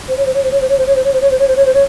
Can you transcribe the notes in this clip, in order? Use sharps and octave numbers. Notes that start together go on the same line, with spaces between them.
C5
C#5
C5
C#5
C5
C#5
C5
C#5
C5
C#5
C5
C#5
C5
C#5
C5
C#5
C5
C#5
C5
C#5